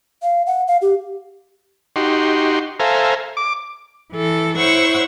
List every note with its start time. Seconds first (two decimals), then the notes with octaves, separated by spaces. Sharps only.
0.22 F5
0.47 F#5
0.68 F5
0.82 G4
1.96 D#4 F#4 G4 C6
2.80 A4 C5 E5 F5 G#5 A#5
3.37 D6
4.11 E3 A4
4.57 E4 C5 C#5 F#5 C#6 E6